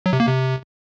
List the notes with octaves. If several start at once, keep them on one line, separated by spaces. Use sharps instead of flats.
F#3
C3
A#3
C3